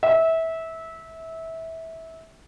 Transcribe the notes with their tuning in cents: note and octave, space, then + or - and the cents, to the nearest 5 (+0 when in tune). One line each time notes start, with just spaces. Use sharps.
E5 -20